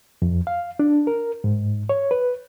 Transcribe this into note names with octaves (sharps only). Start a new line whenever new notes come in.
F2
F5
D4
A#4
G#2
C#5
B4